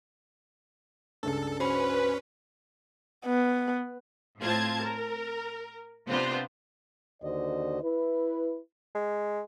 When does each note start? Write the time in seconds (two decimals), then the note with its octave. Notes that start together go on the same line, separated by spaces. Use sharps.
1.23 C#2 G2 A4
1.60 C#4 F#4 B4 C5 B5
3.26 B3
4.40 A2 C4 F4 A5 G#6
4.80 A#4
6.09 C3 B3 C4 D4 F4 C5
7.23 D#2 D3 F#4 C5 D5 D#5
7.83 E4 B4
8.95 G#3